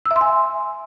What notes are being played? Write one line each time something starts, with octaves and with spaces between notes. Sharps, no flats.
E6
E5
C6
G#5